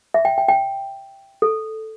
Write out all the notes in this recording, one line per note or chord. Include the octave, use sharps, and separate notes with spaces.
E5
G5
G5
G5
A4